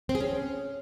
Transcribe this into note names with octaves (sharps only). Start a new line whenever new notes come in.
C4
G#4
C#4